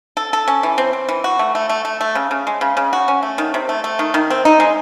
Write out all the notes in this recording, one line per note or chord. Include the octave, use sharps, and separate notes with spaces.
A4
A4
C#4
E3
C4
C4
E3
F#4
A3
A3
A3
A3
A3
C#3
C#3
G#3
C#3
C#3
F#4
C#4
A3
D#3
C3
A3
A3
D#3
D#3
C4
D#4
G#3